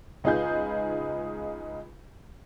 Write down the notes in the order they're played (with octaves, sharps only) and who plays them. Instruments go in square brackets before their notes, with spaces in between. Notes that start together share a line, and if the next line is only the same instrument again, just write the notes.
[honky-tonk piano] C#2 D#4 F4 G#4 B4 G6